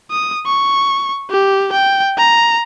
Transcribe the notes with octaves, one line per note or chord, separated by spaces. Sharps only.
D#6
C#6
G4
G5
A#5